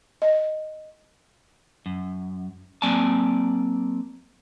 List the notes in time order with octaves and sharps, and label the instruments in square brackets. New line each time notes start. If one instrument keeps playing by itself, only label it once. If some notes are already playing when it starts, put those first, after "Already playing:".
[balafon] D#5
[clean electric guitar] F#2
F#3 A#3 C4 D5 G#5 A5